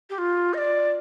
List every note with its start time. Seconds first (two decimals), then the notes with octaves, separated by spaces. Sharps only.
0.10 G4
0.18 F4
0.54 D#5
0.58 D5